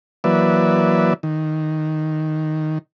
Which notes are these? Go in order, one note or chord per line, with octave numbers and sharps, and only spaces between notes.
E3 F#3 A#3 B4 D5 E5
D#3